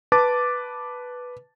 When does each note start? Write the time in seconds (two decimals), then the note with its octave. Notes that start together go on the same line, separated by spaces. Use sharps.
0.12 B4 A5 D6 A6